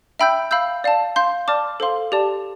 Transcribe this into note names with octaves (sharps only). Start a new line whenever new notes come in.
E5 G5 B5 E6 G6
F5 B5 E6 G6
D5 F5 A5
F5 C6 G6
D5 A5 D6 F6
A4 C5 F5 C6
G4 D5 A5